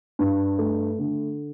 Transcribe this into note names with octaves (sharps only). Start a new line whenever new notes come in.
G2
A3
D3